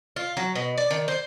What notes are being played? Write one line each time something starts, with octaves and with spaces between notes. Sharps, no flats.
F4
F#3
B2
D5
D#3
C5